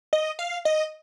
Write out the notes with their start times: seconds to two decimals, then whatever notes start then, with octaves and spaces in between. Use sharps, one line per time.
0.13 D#5
0.39 F5
0.65 D#5